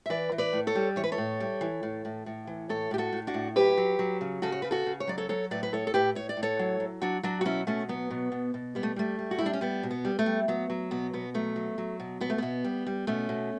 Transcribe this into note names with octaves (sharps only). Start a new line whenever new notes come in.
E5
E3 B4 D5
E3
B4 D5
A2
A4 C#5
G3
E3 C#5
B4
A4 C#5
A2
G3
E3
A2
A2
A2
E3
A2 A4 C#5
A2 G4
F#4 A4
A2
D4 F#4
A2
F#3 G4 B4
F#3
F#3
C#3
C#3 F#4 A4
C#5
C#3 B4
F#4 A4
C#3
C#5
F#3 D5
A4 C#5
F#3 A4 C#5
A2 B4 D5
B4
A2 A4 C#5
A4
A2 G4 B4
A2 C#5
D5
A2
A4 C#5
F#3
F#3
F#3 D4 F#4
F#3 D4 F#4
F#4
B2 C#4 E4
B2 A3 C#4
F#3 B3
B2
B2
B2
G3 B3
A3
G3 A3
G3
F#4
G3 E4
D4
C#4
G3 B3
B2
B3
G3
A3
G3
F#3 B3
F#3
B2 B3
B2 B3
F#3 A3
F#3
F#3
B2
B2 B3
A3
B2 B3
G3
G3
B2 A3 C#4
B2